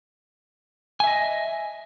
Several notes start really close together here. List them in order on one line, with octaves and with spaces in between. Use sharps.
G#5 E5 D#5